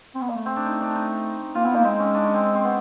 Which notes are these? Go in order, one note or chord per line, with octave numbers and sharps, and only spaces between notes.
C4
B3
A#3
A3
C4
D4
D#4
D4
D#4
A#3 F4
B3 E4
A#3 D#4
G#3 C4
C#4
D4
C#4
C4
C4
B3